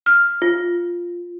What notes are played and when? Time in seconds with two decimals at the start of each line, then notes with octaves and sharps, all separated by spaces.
0.06 F6
0.42 F4